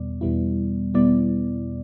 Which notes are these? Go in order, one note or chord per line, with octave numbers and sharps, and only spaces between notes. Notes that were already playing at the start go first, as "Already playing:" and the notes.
Already playing: E2 B2 G3 B3 D5
E2 B2 G3 B3 E4
B2 G3 B3 E4 D5